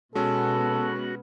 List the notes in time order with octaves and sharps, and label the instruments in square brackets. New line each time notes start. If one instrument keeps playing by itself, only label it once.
[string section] B2 B3 [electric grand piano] G#3 C#4 [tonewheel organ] F#4 [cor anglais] A4